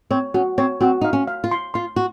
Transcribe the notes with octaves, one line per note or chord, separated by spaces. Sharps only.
C4 C#5
C#4 F#4
C4 C#5
C4 F#4
D#4 F5
C#4
F5
F4
C6
F4 C6
F#4